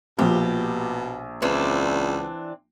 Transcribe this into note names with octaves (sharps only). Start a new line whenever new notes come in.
A#1 B2 F3 A#3 G4
C#2 E3 C4 D4